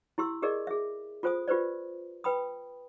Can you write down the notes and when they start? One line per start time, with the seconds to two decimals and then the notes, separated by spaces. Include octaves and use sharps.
0.18 E4 G4 C6 E6
0.42 G4 G#4 A#4 D5 D#5
0.67 G#4 E5
1.23 F4 A4 C5 G#5 D#6
1.48 F4 G4 B4 C5 D5
2.24 B4 G5 B5 D#6